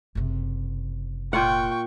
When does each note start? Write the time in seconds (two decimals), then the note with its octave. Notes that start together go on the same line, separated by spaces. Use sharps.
0.15 F#1 C3
1.33 A#2 F4 F#5 G5 C#6